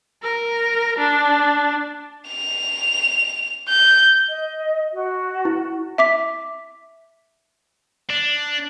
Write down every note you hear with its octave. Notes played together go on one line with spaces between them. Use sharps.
A#4
D4
F7
G6
D#5
F#4
E4
E5 D6 B6
D4